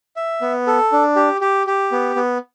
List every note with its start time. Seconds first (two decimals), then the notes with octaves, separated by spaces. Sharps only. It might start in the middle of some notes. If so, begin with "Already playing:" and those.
0.16 E5
0.41 B3
0.67 A4
0.92 D4
1.16 G4
1.41 G4
1.67 G4
1.92 B3
2.16 B3